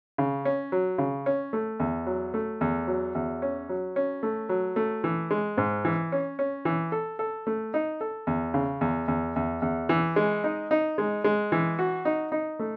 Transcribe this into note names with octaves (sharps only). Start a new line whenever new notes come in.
C#3
C#4
F#3
C#3
C#4
A3
E2
F#3
A3
E2
F#3
E2
C#4
F#3
C#4
A3
F#3
A3
E3
G#3
G#2
E3
C#4
C#4
E3
A4
A4
A3
D#4
A4
E2
C#3
E2
E2
E2
E2
E3
G#3
D#4
D#4
G#3
G#3
E3
F#4
D#4
D#4
A3